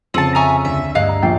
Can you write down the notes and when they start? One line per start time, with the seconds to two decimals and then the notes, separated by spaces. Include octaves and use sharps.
0.14 F2 C#3 C4 A5 C#7 D#7
0.35 E5 G#5 A#5 C#6 D#6 F6
0.65 D2 E5
0.95 G2 G#3 A#3 D#5 F5 F#6
1.09 A#5
1.23 A#1 A4 G5 C7